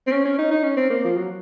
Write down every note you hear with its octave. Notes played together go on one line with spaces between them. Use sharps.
C4
C#4
C#4
D#4
D#4
C#4
C4
A#3
F3
F#3